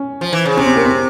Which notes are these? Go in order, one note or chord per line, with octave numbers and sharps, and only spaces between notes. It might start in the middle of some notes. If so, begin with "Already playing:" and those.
Already playing: C#4
F3
E3
C#3
C3 C#4
C4
A#3
C4